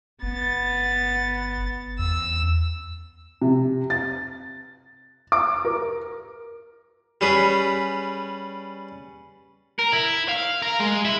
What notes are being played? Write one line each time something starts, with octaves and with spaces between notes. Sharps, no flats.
G1 B3 A6
E2 E6
C3
A6
D6
A#4
G3 C#4 G#4 B4
A#4
E4
F5
A#4
G#3
E4